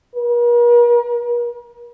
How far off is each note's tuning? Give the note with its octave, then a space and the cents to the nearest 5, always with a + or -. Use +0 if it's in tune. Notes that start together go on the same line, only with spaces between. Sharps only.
A#4 +45